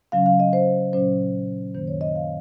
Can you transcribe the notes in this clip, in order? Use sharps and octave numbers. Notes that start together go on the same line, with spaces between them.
C#3 F#3 C#4 F5
F5
D#5
C5
A#2 F#3 C#4 C5
F#2 D#3 A#3 C5
C#5
D#5
F5